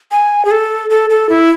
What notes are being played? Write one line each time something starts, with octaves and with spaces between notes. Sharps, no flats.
G#5
G#4
A4
A4
A4
E4